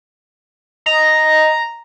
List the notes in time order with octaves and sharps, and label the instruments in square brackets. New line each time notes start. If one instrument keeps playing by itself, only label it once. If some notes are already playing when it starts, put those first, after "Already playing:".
[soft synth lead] D#5 [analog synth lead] A#5